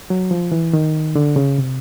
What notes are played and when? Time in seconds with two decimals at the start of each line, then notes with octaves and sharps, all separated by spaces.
0.10 F#3
0.31 F3
0.52 E3
0.73 D#3
1.15 D3
1.36 C#3
1.58 C3